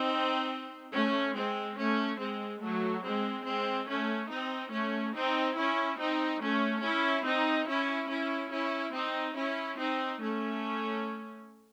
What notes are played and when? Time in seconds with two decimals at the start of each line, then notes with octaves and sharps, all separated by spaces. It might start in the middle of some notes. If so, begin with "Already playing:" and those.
Already playing: C4 D#4
0.94 A3 C#4
1.35 G#3 C4
1.78 A3 C#4
2.20 G#3 C4
2.62 F#3 A3
3.05 G#3 C4
3.46 G#3 C4
3.89 A3 C#4
4.31 C4 D#4
4.73 A3 C#4
5.16 C4 D#4
5.58 C#4 E4
6.00 C4 D#4
6.42 A3 C#4
6.84 C#4 E4
7.26 C4 D#4
7.69 C#4 E4
8.10 C#4 E4
8.53 C#4 E4
8.95 C4 D#4
9.37 C#4 E4
9.79 C4 D#4
10.21 A3 C#4